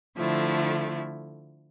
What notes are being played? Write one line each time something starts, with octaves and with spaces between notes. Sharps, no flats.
D3 F3 A3 E4